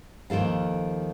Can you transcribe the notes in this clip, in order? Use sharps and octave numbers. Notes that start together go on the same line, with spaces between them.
D#2 D#3 F3 A4 F5